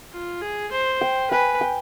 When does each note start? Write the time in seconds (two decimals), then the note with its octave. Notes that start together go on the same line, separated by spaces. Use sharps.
0.12 F4
0.41 G#4
0.72 C5
1.01 G5
1.31 B4 G#5
1.61 G5